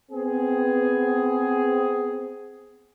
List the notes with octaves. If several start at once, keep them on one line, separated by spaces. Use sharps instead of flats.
B3 C4 G#4